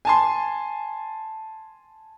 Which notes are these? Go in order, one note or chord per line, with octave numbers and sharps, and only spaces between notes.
G#5 A5 C6